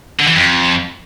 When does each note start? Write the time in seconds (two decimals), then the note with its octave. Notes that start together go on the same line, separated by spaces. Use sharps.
0.19 D3
0.27 E3
0.35 F2